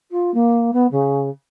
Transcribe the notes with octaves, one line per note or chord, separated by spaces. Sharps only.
F4
A#3
B3
C#3